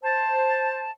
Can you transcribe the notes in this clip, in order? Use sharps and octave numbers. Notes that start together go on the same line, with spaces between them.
C5 A5